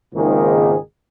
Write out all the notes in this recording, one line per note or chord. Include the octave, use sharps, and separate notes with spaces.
G#1 C#2 G#2 D#3 A#3 G#4